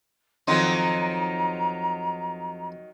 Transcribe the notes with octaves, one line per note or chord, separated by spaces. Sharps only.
F2 D#3 F#3 D#4 C5 A#5